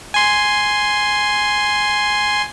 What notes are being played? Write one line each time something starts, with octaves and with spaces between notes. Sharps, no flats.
G#5 C6